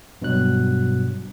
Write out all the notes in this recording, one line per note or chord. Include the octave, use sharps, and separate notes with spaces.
G2 B2 F#3 F#6